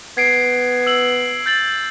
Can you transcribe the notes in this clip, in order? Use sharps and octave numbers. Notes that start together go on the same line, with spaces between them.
B3 G#6 C7 D7
E6 F#7
G6 A6 F#7